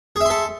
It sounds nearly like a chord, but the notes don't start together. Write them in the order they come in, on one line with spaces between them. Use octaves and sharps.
G#4 E5 C6 A4